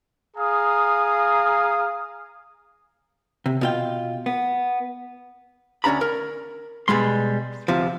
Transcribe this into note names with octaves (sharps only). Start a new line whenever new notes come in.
G#4 F5 A#5 D#6
C3
B2 F4 G5
B3
D2 C#4 D4 A#5 B5
A#4
B2 G3 G#3 C6
D2 C3 F3